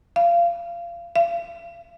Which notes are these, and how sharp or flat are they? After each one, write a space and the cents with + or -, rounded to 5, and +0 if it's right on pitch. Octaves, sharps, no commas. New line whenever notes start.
F5 -25
F5 -40